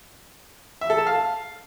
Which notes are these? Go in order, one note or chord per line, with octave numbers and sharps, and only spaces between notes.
E5
A4
A5
F5